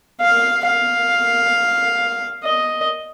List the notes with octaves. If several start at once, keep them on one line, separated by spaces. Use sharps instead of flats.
F5
F5
D#5